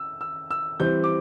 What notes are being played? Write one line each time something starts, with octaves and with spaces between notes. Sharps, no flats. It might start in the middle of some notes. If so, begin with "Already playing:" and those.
Already playing: E6
E6
E6
E3 G3 C4 G6
D6